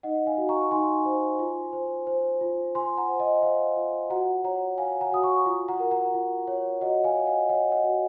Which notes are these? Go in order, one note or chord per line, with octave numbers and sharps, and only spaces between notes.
D#4 D#5 F#5
F5 G#5
F#4
A#5 C#6
D#4 G#5 C6
C5
F4
C5
C5
F4
F4 G#5 C6
F#5 A#5
C5
D#5
C5 F5
F4
F#4 F#5 A#5
C#5 F#5 A#5
C#5 F5 G#5
F#5 A#5
F#4 D#6
A#5 C#6
F4
F#5 A#5
A#4
F#5 A#5
F4
C#5
F#4 D#5 F#5
F5 G#5
C#5
D#5 F#5
C#5 D#5 F#5
D#5 F#5
F#4